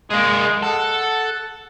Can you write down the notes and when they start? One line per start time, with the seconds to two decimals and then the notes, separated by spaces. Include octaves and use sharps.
0.11 G#3 A#3 G#4
0.62 A4 F#5